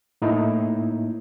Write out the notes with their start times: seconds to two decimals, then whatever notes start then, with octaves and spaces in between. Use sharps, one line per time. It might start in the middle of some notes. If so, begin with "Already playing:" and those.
0.22 A2 A#3 D#4 E4